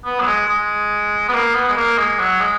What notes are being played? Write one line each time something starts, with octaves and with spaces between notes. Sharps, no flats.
B3
F#3
G#3
G#3
B3
A#3
B3
G#3
A#3
G#3
F#3
G#3